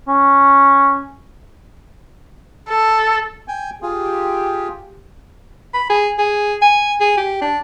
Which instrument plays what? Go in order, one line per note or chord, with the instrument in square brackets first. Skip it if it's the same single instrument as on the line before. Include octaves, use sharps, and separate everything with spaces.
[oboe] C#4
[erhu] A4
[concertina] G5 G#5
[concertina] F4 G#4 [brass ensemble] G4
[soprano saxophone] B5
G#4
G#4
G#5
G#4
G4
D4